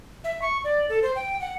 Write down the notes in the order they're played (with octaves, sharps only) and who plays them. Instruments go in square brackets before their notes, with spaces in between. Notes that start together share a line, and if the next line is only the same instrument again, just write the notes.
[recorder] E5
C#6
D5
A4
C5
G5
F#5